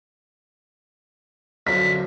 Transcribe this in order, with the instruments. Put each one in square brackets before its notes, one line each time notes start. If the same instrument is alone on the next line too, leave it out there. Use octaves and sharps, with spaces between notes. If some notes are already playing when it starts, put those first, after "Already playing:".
[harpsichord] F#2 D3 F3 [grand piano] B6